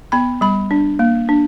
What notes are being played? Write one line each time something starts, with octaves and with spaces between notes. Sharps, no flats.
B3 B5
G3 B5
D4
A#3
D4